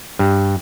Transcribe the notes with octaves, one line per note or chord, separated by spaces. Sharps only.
G2